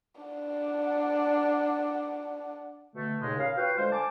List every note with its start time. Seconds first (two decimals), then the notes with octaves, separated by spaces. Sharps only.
0.21 D4 F#5
2.96 B2 D3 A3
3.22 D#2 A#2 C#3 G#3
3.39 C#3 A#4 F5
3.57 F4 F#4 B4 F5 G5
3.78 D3 G#3 C5
3.92 G#5 A5 D6